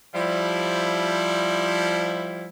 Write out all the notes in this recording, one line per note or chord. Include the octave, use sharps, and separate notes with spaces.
F3 G3 E4